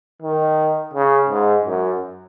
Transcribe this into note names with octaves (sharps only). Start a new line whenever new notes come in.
D#3
C#3
G#2
F#2